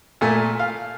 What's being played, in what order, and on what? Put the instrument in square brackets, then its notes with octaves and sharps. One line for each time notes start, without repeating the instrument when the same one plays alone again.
[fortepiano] A#2 A3 A4 G#5
F5